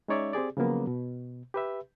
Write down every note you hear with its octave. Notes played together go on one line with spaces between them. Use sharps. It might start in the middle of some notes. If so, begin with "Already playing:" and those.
G#3 C#4 D#4 C#5 D5 E5
C4 G4 G#4 D5
C#3 F3 F#3 A#3 B3
B2
G4 B4 E5